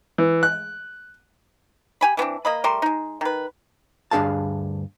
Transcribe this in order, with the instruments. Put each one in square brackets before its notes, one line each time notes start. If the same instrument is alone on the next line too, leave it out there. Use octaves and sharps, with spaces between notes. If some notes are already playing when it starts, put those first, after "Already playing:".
[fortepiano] E3
F#6
[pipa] G4 G#5 B5
E3 B3 C4 D4
A#3 D#5 B5
G3 A3 A#4 C6
G#3 D#4
D#3 B4
[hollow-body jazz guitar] D2 G2 D4 G#4 F5 A5